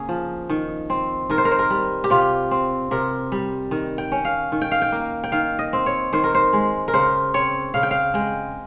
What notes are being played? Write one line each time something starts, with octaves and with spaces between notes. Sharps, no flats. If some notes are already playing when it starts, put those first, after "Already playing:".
Already playing: C#3 A#3 C#4 G#4
F3
D#3
C4
D#3 A#4
C5
A#4
C5
A#4
G3
G4
C3 F4
C4
C3 A#4
G3
D#3
G5
C#4
F5
D#3
G5
F5
G5
A#3
G5
D#3 F5
D#5
C4
C#5
D#3 C5
A#4
C5
G#3
A#4
C#3 C5
C4 C#5
C#3 F5
G5
F5
G#3 G5